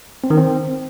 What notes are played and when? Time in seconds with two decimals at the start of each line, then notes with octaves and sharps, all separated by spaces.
0.24 C4
0.30 D#3
0.37 C4